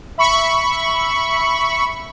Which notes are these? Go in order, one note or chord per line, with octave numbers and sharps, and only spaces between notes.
E5 B5 C#6